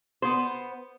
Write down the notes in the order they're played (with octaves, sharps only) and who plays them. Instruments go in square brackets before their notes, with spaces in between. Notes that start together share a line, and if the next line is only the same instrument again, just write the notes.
[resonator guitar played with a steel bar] B3 C5